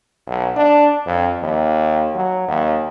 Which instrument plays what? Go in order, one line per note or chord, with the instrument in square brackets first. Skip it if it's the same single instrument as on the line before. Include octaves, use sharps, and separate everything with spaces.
[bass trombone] B1
D4
F2
D#2
F#3
D#2